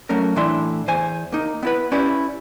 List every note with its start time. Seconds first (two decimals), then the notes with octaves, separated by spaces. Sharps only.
0.09 F#3 A3 A#3 C#4 A#4
0.36 A2 E3 D4 E4 E5 C6
0.88 E2 C5 G#5
1.32 A#3 D#4
1.63 B3 E4 B4
1.92 C#4 E4 G4 B4 D5